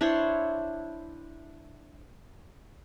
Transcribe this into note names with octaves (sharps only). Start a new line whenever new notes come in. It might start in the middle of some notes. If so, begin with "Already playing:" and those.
D4 E4 C5 C#5